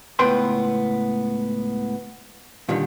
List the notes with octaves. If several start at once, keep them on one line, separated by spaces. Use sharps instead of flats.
C#2 A2 B3 B4 G5 C6
A#2 D3 D#3 G3